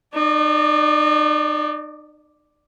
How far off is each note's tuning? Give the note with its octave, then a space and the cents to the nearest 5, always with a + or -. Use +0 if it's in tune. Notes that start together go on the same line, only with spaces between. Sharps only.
D#4 -40 D5 +0